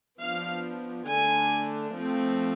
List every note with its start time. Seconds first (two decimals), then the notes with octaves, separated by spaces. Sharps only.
0.20 F3 B3 D4 F5
1.08 D3 A3 D4 G#5
1.97 F3 A3 C4